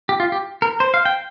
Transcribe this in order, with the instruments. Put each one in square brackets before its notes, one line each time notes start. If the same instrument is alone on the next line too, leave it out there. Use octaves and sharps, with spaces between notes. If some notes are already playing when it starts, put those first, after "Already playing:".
[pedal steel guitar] G4
F4
G4
A#4
C5
F5
G5